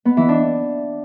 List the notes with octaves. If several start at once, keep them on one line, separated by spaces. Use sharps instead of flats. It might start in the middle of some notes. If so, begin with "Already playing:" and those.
B3
E3
D4